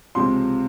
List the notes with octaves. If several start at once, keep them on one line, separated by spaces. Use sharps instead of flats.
C#2 C3 F3 C6